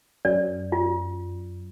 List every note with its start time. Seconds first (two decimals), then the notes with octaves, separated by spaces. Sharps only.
0.25 F#2 D5
0.72 F4